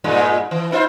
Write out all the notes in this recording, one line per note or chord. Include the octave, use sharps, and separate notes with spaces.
G2 A#2 G#3
E3
D#4 F4 C5